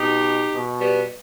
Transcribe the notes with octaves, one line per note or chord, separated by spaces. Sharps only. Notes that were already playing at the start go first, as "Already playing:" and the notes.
Already playing: B2 D#4 G4
B2
G3 B3